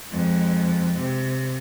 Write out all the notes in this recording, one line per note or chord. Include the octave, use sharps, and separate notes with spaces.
F2 G#3
C3